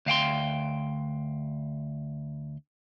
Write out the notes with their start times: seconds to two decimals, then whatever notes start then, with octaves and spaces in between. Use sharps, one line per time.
0.06 D2 F5 G5 C6